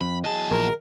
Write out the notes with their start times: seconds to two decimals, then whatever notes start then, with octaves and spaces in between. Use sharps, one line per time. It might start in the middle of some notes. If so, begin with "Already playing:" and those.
0.01 F2 B5
0.24 E2 F#3 G#4 D#5 A5
0.51 A#1 A#4